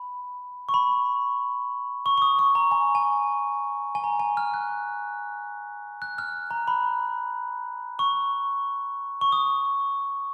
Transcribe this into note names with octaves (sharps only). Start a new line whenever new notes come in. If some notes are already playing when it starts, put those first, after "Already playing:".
Already playing: B5
C#6
B5
C#6
C#6
D#6
C#6
A#5
G#5
G#5
G#5
A#5
G#5
F6
F#6
F#6
F6
A#5
B5
C#6
C#6
D#6